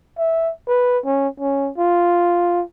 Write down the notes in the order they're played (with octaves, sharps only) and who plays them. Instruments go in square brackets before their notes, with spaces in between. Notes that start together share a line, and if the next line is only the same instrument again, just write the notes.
[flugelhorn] E5
B4
C#4
C#4
F4